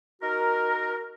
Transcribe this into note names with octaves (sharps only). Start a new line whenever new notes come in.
D#4 F#4 A#4